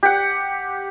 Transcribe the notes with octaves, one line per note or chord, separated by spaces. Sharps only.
G4 F#5